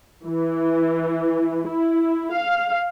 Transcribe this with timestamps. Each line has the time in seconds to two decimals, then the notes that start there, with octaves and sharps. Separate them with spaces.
0.25 E3
1.67 E4
2.33 F5